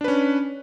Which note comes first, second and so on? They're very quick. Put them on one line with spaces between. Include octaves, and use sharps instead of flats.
D4 B4 C#4